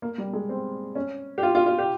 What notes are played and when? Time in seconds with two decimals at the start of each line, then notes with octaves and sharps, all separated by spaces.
0.02 A#3
0.18 G3
0.33 G#3
0.49 C4
0.95 C#4
1.38 G4
1.43 F4
1.55 F4
1.66 F4
1.78 G4